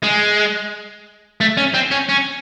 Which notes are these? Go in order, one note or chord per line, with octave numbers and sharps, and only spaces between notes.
G#3
A3
C#4
C4
C#4
C#4